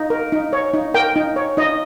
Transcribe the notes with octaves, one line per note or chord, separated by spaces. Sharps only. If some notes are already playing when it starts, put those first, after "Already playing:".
Already playing: D#4
A#4
D#4
C#5
D#4
A#4 G5
D#4
C#5
D#4 D#5